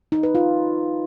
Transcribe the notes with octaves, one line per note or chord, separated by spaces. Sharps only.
D#4
B4
F4